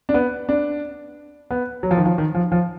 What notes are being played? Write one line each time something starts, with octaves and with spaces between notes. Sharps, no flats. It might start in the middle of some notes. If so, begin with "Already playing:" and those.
D4
B3
D4
B3
F#3
F3
D#3
F3
D#3
F3
F3